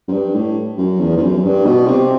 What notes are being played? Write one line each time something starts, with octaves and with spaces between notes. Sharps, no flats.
F#2
G2
A2
F#2
E2
E2
F#2
G2
B2
C3